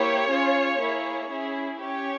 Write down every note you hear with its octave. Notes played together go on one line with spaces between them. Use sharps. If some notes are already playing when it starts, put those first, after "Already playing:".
Already playing: A#3 E4 G4 C#5
C#4 F4 G#4
A#3 E4 G#4
C#4 E4 G#4
C#4 G4 C#5